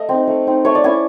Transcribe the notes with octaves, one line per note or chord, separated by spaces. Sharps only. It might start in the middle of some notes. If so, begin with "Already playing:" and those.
Already playing: A3 D#5
C4 D#4
A3
C4 D#4
A3 C#5
D5
C#4 E4 G#5